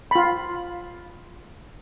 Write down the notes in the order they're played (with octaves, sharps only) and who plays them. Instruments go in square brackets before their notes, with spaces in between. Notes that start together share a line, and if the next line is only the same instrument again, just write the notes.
[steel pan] F4 B5